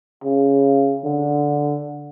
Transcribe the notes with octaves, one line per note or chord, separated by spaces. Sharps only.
C#3
D3